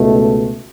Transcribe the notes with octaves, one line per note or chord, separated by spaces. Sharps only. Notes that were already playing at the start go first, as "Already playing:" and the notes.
Already playing: C#2 B2 A3